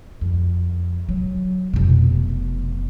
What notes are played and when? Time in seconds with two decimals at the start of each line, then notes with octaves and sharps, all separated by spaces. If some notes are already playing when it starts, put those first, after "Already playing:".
0.21 F2
1.09 F#3
1.74 F1 B2